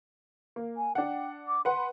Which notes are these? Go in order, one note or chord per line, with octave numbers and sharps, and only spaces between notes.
A#3
G#5
D4 F#5 G5
D6
B4 F#5 C6